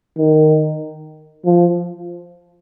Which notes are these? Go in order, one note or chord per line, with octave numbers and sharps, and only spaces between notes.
D#3
F3